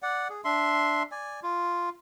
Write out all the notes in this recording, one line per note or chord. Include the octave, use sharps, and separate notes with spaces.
D5 F#5
G#4
D4 E5 C6
D5 G#5
F4